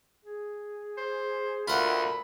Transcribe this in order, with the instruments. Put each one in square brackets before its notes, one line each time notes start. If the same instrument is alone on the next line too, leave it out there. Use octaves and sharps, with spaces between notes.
[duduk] G#4
[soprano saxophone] C5
[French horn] D2 [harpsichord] F4 F#5 [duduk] A#4 [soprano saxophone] B5